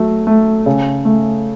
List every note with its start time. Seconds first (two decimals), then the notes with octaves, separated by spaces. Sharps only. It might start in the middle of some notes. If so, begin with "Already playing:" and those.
Already playing: F#3 A3
0.27 A3
0.66 C#3
1.05 A3